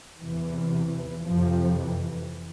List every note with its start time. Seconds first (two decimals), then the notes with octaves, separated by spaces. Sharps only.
0.23 E2 C3 E3
1.27 F2 C3 F3
1.80 E3